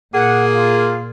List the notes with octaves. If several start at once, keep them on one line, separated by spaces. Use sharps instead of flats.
A#2 A#3 G#4 F#5
F4